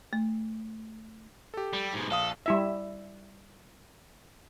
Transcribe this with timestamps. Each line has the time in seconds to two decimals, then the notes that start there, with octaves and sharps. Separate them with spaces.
0.13 A3
1.54 G4 A4
1.73 G3
1.93 G#2 B2
2.10 A#1 A4 F5 D#6
2.46 G3 E4 E5